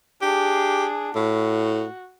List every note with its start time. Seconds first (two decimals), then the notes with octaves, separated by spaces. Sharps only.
0.22 D4 G4 G#4
1.15 A2 F#4